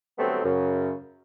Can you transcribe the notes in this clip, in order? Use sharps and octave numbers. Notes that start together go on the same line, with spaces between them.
D3 F#3 G3 A3 B3 C4
F#2 C#3